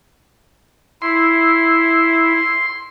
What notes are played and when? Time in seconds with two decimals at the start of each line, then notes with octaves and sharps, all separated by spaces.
1.02 E4 C6